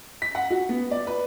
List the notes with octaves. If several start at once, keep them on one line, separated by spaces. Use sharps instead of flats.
B6
F#5
F#4
B3
D5
B4